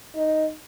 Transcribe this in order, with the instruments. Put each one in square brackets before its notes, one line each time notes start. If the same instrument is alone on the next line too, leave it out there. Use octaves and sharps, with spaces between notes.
[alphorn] D#4